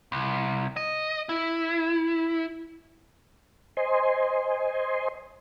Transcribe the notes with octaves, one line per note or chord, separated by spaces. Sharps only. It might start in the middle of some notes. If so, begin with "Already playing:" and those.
C2
D#5
E4
C5 D#5 G#5 C6